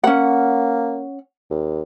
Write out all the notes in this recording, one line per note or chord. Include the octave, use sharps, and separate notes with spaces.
A#3 C#4 F#5
D#2